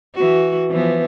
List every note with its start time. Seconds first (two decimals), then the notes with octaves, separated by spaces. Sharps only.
0.15 E3 F#4
0.71 E3 F3 B3